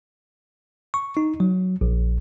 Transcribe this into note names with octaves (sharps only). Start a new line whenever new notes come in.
C#6
D#4
F#3
A#1